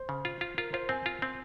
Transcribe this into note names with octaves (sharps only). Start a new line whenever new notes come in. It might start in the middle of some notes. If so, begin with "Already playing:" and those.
Already playing: C5
C#3
F4
F4
F4 A#4
F4 C5
C4 G#5
F4
C4